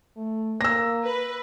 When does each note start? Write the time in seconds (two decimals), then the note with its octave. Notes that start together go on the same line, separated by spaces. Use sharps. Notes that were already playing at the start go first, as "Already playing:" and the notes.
0.16 A3
0.61 A#3 E6 A#6
1.04 B4